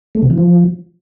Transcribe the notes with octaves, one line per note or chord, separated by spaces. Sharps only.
A3
C3
E3
F3